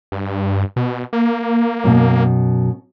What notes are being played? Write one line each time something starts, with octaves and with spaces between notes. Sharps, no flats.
G2
B2
A#3
F#2 B2